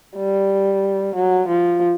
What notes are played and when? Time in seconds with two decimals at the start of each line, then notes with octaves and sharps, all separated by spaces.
0.17 G3
1.15 F#3
1.48 F3